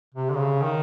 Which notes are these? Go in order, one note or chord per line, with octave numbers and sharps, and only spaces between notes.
C3
D3
C#3
D#3